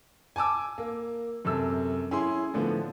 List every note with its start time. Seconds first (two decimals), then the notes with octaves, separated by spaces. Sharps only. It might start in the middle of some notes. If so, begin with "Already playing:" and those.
0.36 G#5 A5 D6 E6
0.78 A#3
1.45 F#2 C3 A4 E6
2.11 C#4 E4 G#4 C6
2.54 A2 D3 F3 B3